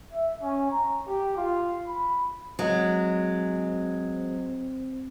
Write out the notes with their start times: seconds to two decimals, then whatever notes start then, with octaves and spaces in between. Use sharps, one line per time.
0.13 E5
0.42 C#4
0.71 A#5
1.07 G4
1.37 F4
1.87 B5
2.59 F#3 G#3 C4